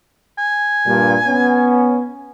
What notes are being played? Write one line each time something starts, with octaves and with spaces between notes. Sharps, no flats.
G#5
G2 A#2
B3 C#4